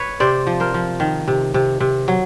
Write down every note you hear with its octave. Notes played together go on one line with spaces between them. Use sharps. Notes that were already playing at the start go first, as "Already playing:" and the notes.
Already playing: B4 C#5
C3 C5 D5
F3
A#4 C5
F3
D#3
C3
C3
C3
F#3